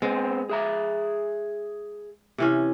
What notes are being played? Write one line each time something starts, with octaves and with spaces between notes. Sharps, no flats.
G#3 B3 C4
G#4 E5 A#5
C3 E3 C#4